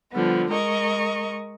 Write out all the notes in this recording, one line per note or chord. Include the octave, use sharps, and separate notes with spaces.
D3 F3 G3 B3
G#3 A#4 D#5 C#6